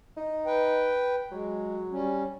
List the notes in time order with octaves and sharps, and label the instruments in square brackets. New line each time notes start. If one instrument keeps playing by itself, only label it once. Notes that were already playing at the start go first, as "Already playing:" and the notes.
[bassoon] D#4
[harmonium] B4 G5
[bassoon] F#3 [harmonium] G#3
[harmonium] G3 C#4